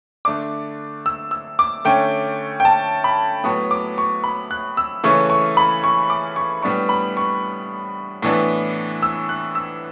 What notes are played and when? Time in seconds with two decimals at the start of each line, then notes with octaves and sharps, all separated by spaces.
0.25 D3 A3 D4 D6
1.06 E6
1.31 E6
1.59 D6
1.85 D3 A3 C#4 G5
2.60 G5
2.65 A5
3.04 B5
3.44 A2 F#3 B3 C#6
3.71 D6
3.98 C#6
4.24 B5
4.51 F#6
4.77 E6
5.04 C#3 E3 A3 C#4 C#6
5.30 C#6
5.57 B5
5.84 C#6
6.10 D6
6.36 C#6
6.63 A2 G3 B3 D4 C#6
6.89 B5
7.17 C#6
8.22 A2 E3 B3 D4
9.02 E6
9.29 F#6
9.55 E6